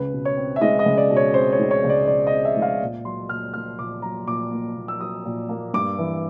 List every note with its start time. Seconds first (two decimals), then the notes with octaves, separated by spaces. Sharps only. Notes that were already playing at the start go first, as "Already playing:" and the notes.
Already playing: C#2 B4
0.13 B2
0.25 C#5
0.37 C4
0.56 E5
0.61 G#3 D#5
0.79 D#5
0.86 C#2
0.98 D5
1.10 B2
1.16 C#5
1.34 C4 C5
1.52 C#5
1.59 G#3
1.71 C#5
1.84 C#2
1.90 D5
2.07 B2 D5
2.27 D#5
2.33 C4
2.45 E5
2.57 G#3
2.62 F5
2.82 A#2
3.05 F#3 C6
3.29 A#2 F6
3.54 A#3 F6
3.78 A#2 D6
4.02 F#3 A#5
4.27 A#2 D6
4.51 A#3
4.76 A#2
4.88 E6
5.00 F#3 D#6
5.26 A#2
5.49 A#3
5.74 G2 D6
5.99 E3